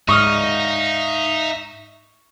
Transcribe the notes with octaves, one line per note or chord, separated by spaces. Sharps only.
G#2 D#4 D#5 E5 C#6 D#6 F6